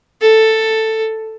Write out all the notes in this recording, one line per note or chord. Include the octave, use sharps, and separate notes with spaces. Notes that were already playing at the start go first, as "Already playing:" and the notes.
A4